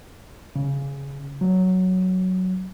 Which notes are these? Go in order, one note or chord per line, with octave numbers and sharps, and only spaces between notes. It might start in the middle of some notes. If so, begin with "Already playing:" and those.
C#3
F#3